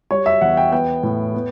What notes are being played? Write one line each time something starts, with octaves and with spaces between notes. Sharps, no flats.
G3 C#5
E5
E2 F#5
G5
B3 G5
A2
B3